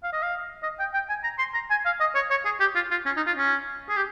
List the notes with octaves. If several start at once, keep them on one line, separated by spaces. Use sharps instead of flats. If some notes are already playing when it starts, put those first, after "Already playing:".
F5
D#5
F5
D#5
G5
G5
G#5
A#5
C6
A#5
G#5
F5
D#5
C#5
C#5
G#4
G4
F4
F4
C#4
D#4
F4
C#4
G#4
G4